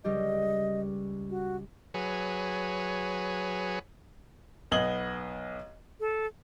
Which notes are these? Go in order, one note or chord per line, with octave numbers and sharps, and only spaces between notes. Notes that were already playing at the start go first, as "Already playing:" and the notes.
C#2 G3 G4 D#5
F#4
F#3 G#4 B4 C#5
B1 B3 D#5 G#6 F#7 G7
A4